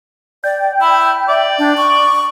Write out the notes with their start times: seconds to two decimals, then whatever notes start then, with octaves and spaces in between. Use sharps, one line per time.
0.44 D5 G5
0.81 E4 B5
1.29 D5 E5
1.59 D4
1.77 C#6